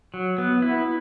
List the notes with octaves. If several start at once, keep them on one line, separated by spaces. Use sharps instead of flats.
F#3
B3
E4